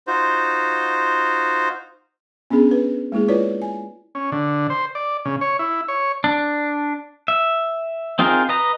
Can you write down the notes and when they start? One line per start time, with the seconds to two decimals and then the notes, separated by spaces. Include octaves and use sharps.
0.07 D#4 F4 F#4 C5
2.50 B3 C#4 D4 G#4
2.71 B4
3.12 G#3 A#3 E4 G#4
3.28 E4 F4 B4 C#5 D5
3.62 G#5
4.15 C#4
4.32 D3
4.70 C5
4.95 D5
5.25 C#3
5.41 C#5
5.59 E4
5.88 C#5
6.24 D4
7.28 E5
8.19 C4 D#4 F4 G#4 A#4
8.49 B4 D#5 A#5